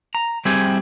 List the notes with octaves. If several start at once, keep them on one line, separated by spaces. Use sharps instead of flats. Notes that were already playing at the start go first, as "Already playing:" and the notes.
A#5
G3 C4 E4 G4 G#4